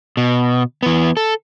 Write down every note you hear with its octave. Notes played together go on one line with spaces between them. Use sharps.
B2
E3 B3
A4